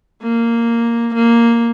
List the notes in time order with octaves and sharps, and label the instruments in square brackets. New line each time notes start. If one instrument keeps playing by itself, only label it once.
[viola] A#3
A#3